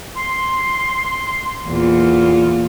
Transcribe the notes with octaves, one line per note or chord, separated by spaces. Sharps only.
C6
E2 A#2 F4